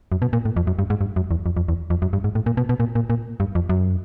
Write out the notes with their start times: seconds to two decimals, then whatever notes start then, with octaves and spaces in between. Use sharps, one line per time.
0.12 F#2
0.22 B2
0.33 A#2
0.45 A2
0.56 F2
0.67 F#2
0.79 G2
0.90 G#2
1.01 G2
1.16 F#2
1.31 E2
1.46 F2
1.57 F2
1.68 E2
1.90 F2
2.02 F#2
2.13 G2
2.24 G#2
2.35 A2
2.46 A#2
2.57 B2
2.69 B2
2.80 A#2
2.95 A#2
3.10 A#2
3.40 G2
3.55 F2
3.69 F#2